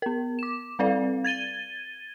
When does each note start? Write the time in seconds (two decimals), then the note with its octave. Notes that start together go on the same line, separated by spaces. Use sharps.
0.02 B3 A#4
0.39 D6 E7
0.79 G3 C4 A4 B4 D5 F5
1.24 G#6 A6 D#7 G7